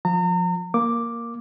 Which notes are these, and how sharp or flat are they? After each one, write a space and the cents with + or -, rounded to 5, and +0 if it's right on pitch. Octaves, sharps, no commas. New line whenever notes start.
F3 +20 A#5 -40
A#3 +0 D6 +0